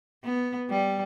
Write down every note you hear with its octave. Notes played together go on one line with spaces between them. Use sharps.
B3
G3